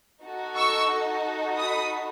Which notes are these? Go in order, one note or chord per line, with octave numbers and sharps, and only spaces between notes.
D#4 F#4 A4
C#6 E6
B5 D#6